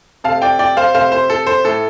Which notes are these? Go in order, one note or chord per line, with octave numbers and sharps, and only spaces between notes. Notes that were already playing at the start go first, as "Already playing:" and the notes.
C3 A3 F5 A5
D5 G5
D5 G5
C5 F5
C3 A3 C5 F5
C5
A4
C5
A2 A3 A4